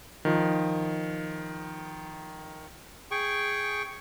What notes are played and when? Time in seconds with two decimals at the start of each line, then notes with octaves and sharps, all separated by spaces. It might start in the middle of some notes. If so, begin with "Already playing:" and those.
0.25 D#3 F3
3.11 G#4 G5 C#6